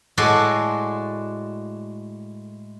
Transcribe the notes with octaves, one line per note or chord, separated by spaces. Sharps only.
A2 G#3 F#4 A4 D5 C6